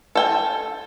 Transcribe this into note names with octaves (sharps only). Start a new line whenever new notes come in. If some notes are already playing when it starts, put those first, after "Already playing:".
A4 G5 G#5